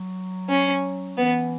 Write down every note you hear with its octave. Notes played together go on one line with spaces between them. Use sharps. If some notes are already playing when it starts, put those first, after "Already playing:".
Already playing: F#3
C#4
E3 B3